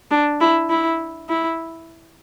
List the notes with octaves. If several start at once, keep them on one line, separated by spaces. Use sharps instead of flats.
D4
E4
E4
E4